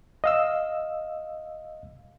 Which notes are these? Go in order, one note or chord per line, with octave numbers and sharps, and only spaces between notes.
D#5 F5 E6